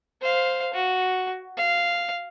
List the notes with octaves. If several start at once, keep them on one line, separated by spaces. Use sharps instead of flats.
C5 F5
F#4
F5